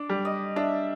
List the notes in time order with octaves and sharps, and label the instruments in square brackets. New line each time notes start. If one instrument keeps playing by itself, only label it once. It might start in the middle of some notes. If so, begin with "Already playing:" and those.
Already playing: [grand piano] D4 [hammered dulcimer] D5
[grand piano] G3
[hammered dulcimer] D#5
[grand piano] D4 [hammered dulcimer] E5